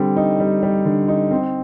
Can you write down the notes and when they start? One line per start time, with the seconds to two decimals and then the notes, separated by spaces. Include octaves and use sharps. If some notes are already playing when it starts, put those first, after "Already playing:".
Already playing: D3 G3 C4
0.16 D#4
0.40 G3
0.63 G3
0.85 D3
1.08 D#4
1.31 C4